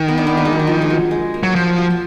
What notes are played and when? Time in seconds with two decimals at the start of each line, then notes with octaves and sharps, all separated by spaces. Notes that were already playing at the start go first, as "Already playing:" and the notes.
Already playing: D#3
0.08 B3
0.18 D4
0.27 B3
0.37 A#3
0.45 G#3
0.53 F#3
0.59 G#3
0.67 F3
0.82 G#3
0.90 F#3
1.11 G#3
1.34 A#3
1.43 F#3
1.55 F3 F#4
1.78 F#4
1.90 F4